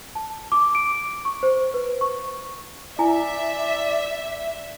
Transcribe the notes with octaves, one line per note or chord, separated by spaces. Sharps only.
A5
D6
D7
C#6
C5
B4
C#6
E4 D5 E5 G#5